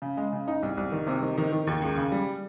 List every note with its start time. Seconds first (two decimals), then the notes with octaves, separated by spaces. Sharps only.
0.02 C#3
0.17 G#3
0.33 C#3
0.48 D#4
0.63 C2
0.77 C2
0.92 D#3
1.07 C3
1.22 D#3
1.38 D#3
1.53 D#3
1.67 D#2
1.82 C#2
1.97 C#3
2.12 G3